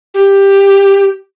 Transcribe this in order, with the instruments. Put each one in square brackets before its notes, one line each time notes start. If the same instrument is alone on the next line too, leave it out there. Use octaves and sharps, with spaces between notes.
[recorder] G4